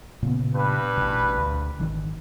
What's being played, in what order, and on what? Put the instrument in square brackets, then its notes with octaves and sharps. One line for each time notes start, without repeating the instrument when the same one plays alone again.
[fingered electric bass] A#2 C#3 B3
[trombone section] G2 B4
[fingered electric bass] A1 B2
D2
G#1 D#3 E3